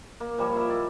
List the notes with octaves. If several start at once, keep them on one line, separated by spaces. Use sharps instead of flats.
A#3
F3 G3 A#3 C#5
E4 A#4 D#5 E5
D5